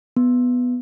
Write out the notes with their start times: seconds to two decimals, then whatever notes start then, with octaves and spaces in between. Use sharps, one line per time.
0.16 B3